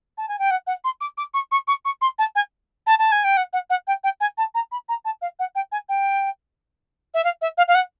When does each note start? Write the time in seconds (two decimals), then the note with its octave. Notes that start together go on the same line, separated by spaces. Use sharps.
0.18 A5
0.28 G#5
0.39 G5
0.51 F#5
0.67 F#5
0.84 C6
1.01 D6
1.17 D6
1.34 C#6
1.51 C#6
1.67 C#6
1.85 C#6
2.01 C6
2.19 A5
2.35 G#5
2.86 A5
2.99 A5
3.12 G#5
3.24 G5
3.37 F#5
3.53 F#5
3.70 F#5
3.87 G5
4.04 G5
4.20 G#5
4.37 A5
4.54 A#5
4.71 B5
4.89 A#5
5.05 A5
5.21 F5
5.39 F#5
5.55 G5
5.72 G#5
5.89 G5
7.14 E5
7.24 F5
7.41 E5
7.57 F5
7.68 F5
7.75 F#5